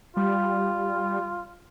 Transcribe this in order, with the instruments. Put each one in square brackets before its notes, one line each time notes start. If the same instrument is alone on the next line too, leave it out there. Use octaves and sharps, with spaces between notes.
[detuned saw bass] G3 [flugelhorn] F4